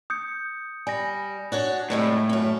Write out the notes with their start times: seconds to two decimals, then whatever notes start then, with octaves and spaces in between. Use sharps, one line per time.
0.10 D#6 G6 C#7
0.87 G3 G#5 A#6
1.52 D4 F#4 C#5
1.90 A2 C3 G3 G#3
2.29 F#2 C#4